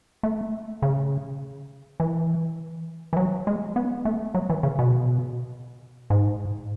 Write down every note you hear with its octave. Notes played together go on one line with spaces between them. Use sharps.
A3
C#3
E3
E3
F#3
G#3
B3
A3
F#3
E3
C#3
B2
G#2